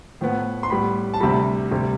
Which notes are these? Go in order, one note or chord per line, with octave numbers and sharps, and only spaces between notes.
A2 F3 B3
C6
A2 G3 B3 B5
A5
D2 C3 G3 B5
D2 C3 G3